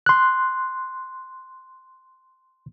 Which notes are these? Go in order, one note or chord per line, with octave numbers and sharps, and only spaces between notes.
C6 F#6